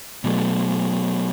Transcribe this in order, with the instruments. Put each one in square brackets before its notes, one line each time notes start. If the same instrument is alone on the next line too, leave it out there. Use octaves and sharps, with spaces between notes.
[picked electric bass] B2 F#3 A3